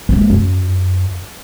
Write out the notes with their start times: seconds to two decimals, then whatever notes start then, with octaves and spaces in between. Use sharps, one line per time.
0.09 G#3 A#3
0.30 F#2